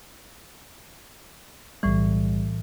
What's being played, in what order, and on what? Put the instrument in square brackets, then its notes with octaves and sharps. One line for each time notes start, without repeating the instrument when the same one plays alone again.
[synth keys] B1 G3 [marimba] A2 E3